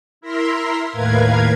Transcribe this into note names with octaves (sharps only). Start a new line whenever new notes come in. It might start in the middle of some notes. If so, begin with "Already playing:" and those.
E4 A#4 E5 A#5 C6
D#2 A2 A#4 B4 F5 G#6